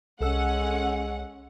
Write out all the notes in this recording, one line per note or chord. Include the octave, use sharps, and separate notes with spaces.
C2 G#3 C#4 A4 F#5 E6